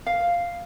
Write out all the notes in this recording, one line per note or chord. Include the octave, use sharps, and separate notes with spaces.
F5